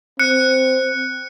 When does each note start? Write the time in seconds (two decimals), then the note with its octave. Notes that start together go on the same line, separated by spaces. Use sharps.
0.19 C4 F#6 C#7